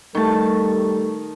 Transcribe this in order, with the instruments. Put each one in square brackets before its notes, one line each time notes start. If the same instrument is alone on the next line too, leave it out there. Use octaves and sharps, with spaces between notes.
[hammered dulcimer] D#3 A5 [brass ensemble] G3 A4 [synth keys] A3 C#6